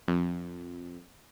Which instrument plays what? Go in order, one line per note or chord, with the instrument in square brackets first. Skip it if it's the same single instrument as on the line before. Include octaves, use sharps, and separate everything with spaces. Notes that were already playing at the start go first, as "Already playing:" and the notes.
[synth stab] F2